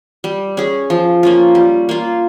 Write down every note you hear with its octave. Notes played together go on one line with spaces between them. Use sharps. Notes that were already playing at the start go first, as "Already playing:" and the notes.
G3
C#4 G#4
F3
A#3 C#4 F4
G3
A#3 F4